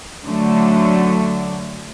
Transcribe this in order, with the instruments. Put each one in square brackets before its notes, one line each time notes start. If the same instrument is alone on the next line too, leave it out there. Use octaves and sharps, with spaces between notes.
[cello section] D3 F#3 A3